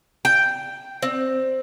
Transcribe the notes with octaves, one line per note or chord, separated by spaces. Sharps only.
G5
C4